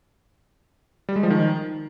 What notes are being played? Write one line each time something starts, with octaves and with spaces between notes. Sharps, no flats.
G3
G#3
F3
D#3